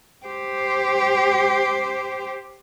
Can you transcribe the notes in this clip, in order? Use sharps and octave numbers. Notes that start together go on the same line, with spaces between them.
G4 C5